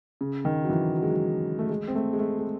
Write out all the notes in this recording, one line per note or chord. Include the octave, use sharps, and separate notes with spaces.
C#3
D#3
F#3
E3
F#3
G#3
F#3
A3
G#3
C4
A3
G#3
A3
G#3